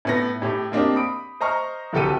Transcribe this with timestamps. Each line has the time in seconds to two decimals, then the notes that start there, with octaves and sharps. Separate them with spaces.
0.05 A2 B3 A#6
0.42 A2 G4
0.72 A#3 C4 D4 G4 D#5
0.96 B5 D#6 D7
1.41 C5 D#5 A#5 C#6 F6
1.93 D1 C2 G4 A4 G5 D#7